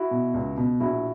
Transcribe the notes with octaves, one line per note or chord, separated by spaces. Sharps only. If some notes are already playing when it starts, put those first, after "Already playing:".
Already playing: E4 F#4
B2
C#2
B2
A#1 E4 F#4